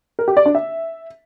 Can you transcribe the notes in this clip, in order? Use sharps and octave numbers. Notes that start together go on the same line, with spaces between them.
A#4
G4
D5
D4
E5